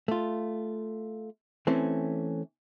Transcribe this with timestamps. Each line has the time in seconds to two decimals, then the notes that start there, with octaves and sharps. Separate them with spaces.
0.08 A3 F4
1.67 E3 A3 C4 C#4